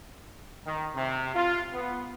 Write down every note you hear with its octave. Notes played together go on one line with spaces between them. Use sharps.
D#3
C3
F4
B3